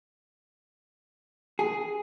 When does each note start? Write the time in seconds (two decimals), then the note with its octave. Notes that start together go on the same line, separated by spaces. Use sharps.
1.59 G#4